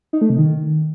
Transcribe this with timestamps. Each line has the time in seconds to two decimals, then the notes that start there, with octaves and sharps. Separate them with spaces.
0.13 D#4
0.21 A3
0.30 C3
0.38 D#3